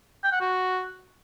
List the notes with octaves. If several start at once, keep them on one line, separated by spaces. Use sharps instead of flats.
G5
F#5
F#4